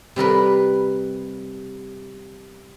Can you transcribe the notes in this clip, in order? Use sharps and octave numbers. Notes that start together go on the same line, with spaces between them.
C3 G3 A#4 B4